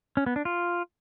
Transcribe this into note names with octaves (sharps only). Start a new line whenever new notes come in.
C#4
B3
D4
F4